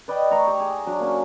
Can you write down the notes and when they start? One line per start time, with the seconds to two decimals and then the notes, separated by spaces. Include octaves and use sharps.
0.08 B4 D5 D#5 G5
0.31 A3 A#5 C#6
0.47 G4
0.60 G#4
0.86 F#3 D4
1.00 A#3 C#4